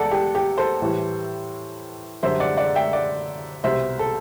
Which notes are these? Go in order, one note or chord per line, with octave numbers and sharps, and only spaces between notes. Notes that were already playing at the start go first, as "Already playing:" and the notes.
Already playing: E2 A4 D5 F#5
G4
G4
A4 C5
A2 E3 G3
F#2 D3 G3 C5 E5
D5 F#5
D5 F#5
E5 G5
D5 F#5
C2 B2 G3 C5 E5
A4